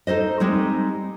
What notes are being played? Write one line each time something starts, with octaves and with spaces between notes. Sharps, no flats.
D#4 A4 C5 D#5
G3 G#3 C4 D#4